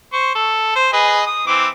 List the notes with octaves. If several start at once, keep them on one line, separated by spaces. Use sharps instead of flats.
C5 C#6
A4
C5
G#4 B4 D#5
D#6
E3 C4 D6